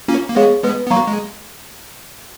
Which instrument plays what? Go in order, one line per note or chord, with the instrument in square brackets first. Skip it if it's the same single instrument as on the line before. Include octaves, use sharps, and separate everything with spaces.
[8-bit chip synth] A#3 C#4 [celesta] F4
[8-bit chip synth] A#3
[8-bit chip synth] G#3 B3 [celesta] G#4 C#5 F5
[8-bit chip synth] G#3 B3 [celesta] B4
[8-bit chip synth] B3
[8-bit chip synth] F#3 A#3 [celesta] F5 A#5 C#6
[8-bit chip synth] G#3